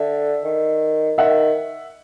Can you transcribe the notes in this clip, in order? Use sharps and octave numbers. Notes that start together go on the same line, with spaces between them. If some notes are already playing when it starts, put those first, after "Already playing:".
Already playing: D3 D5 E5
D#3
D#3 E5 F#5